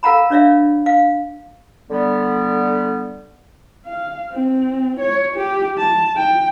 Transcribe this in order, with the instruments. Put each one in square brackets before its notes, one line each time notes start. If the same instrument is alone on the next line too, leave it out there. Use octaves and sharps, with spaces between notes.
[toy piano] A4 A#4 F5 F#5 A#5 B5
D4 C#5 D5 E5 F5
F5
[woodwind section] D3 G3 B3
[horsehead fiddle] F5
C4
C#5
G4
A5
G5